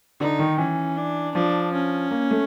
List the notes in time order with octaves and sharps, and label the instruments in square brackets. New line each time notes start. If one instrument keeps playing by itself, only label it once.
[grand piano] D3 [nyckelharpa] D#4
[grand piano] D#3
[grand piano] E3 [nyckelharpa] C#4
[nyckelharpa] D4
[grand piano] F3 [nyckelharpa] D4
[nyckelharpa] C#4
[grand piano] A#3
A3